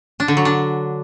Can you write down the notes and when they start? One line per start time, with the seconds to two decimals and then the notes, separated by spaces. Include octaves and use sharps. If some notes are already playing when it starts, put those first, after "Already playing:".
0.20 D4
0.28 D3
0.37 F#3
0.45 D4